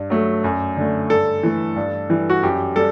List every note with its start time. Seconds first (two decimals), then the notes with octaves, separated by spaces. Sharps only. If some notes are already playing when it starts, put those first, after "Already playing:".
Already playing: G2
0.10 F#3 A3
0.44 F#2
0.77 D3 A3
1.10 G2 A4
1.43 E3 A3
1.76 G2
2.10 E3 G3
2.30 F#4
2.43 F#2 G4
2.76 G3 A4